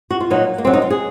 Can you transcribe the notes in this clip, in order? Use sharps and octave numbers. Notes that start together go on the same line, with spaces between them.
F#4
F4
A#2 F#3 D#4
A#3
C3 F#3 C4
D#4
F4
G#4